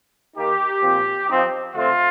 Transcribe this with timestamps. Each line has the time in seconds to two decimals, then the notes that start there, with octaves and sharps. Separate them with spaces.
0.37 D#3 A#3 D#4 G4
0.83 A#2 F3 C4
1.28 F3 C4 D#4
1.74 D3 A3 C4 F4